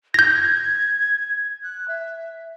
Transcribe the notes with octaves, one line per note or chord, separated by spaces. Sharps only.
G6 G#6 A#6
F#6
E5